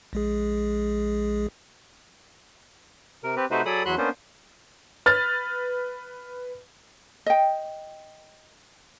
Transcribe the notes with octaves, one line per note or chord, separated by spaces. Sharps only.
A#1 G#3 G#4
C3 A#4
C4 G4 B4
C3 A3 D#4 F#4 B4 C5
F#3 G#4 A4 D5 B5 D#6
E2 F#3 F#4 B5 C6 F#6
A#3 B3 C#4 D4 C5
B4 F6 A6
D#5 G5